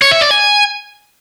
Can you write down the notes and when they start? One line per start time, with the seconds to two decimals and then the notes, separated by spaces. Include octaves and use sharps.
0.02 C#5
0.11 E5
0.21 D5
0.31 G#5